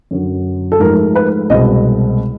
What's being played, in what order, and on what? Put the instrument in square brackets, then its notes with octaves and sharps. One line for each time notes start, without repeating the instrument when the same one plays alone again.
[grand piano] F#2 D3 F#3
A4
G#2 F3 A3 A#4
B4
C2 B2 G#3 C4 D#5